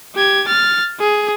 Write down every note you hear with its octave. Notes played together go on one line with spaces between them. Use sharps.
G4 G#6
F6 A6
G#4